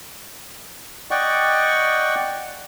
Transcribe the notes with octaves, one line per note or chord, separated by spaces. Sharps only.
D5 D#5 F#5 G5 C#6